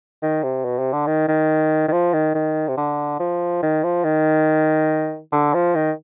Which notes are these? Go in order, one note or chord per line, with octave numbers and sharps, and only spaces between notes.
D#3
C3
B2
C3
D3
D#3
D#3
D#3
F3
D#3
D#3
C3
D3
F3
D#3
F3
D#3
D3
F3
D#3